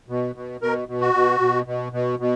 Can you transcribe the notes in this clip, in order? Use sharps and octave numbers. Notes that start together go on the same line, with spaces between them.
B2
B2
B2 A#4
B2
F#4
B2
B2
B2
B2
B2